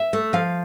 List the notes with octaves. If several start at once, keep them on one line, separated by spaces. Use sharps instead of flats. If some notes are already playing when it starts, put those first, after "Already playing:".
Already playing: E5
A3
F3 F5